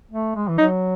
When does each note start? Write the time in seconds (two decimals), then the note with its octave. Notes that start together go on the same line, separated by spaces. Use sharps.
0.11 A3
0.35 G#3
0.48 E3
0.58 F#3 D#4